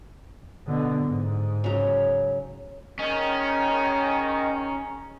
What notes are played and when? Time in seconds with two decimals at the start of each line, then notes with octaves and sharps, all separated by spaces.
0.67 B2 D3
1.06 G#2
1.64 C#3 F#3
2.99 D#3 C#4 G#4 D#5 A#5